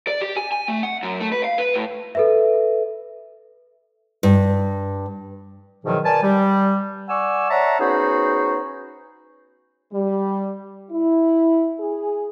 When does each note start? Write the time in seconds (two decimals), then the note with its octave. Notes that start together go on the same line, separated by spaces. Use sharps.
0.07 D5
0.22 G4
0.37 G#5
0.52 G#5
0.68 A3
0.83 F#5
1.03 F#2
1.20 A3
1.32 B4
1.44 F5
1.58 B4
1.74 A2
2.15 A4 B4 E5
4.23 G2
5.84 E2 G#2 B2 D#3 F3 F#3
6.04 A#4 B4 D5 G#5 A5
6.23 G3
7.09 D5 F#5 G#5 C#6 E6
7.50 C#5 D5 E5 F#5 A5 A#5
7.79 B3 C#4 D#4 F#4 G#4 C5
9.93 G3
10.91 E4
11.80 G#4